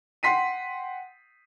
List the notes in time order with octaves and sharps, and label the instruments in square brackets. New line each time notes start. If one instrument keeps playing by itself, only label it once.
[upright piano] F#5 G5 C6 B6 C7 D#7